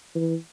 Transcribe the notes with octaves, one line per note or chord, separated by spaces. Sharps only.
E3